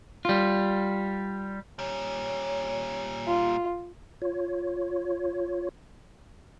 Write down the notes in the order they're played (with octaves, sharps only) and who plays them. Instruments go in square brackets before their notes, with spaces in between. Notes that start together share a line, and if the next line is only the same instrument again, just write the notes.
[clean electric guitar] G3 F4
[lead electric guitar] A#2 G3 [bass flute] C#5
[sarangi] F4
[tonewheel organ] F4 C#5